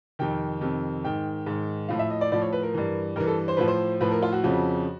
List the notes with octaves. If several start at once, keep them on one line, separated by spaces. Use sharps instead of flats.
F2 C3 D#3 G5
F2 C3 D#3
G#2 D#3 G5
G#2 D#3
A2 F3 F5
E5
D#5
D5
A2 F3 D5
C#5
B4
A#4
G2 E3
G2 E3 A#4
A4
C5
A2 F3 B4
C5
A2 F3 B4
A#4
F4
F#4
F2 C#3 F3